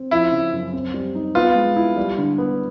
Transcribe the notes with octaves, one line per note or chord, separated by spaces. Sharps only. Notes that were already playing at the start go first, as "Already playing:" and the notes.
Already playing: C4
F3 E4
C#3
F#2
C4
G3
D#4
B3 F4
G#3
E4
G3
D3
B3